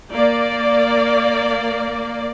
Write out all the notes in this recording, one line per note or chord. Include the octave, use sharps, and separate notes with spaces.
A#3 D5